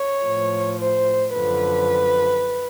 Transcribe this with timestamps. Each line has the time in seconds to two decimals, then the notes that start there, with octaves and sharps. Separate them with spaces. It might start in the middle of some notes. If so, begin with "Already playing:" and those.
Already playing: C#5
0.24 A2 F3
0.79 C5
1.33 F#2 D3 F3 B4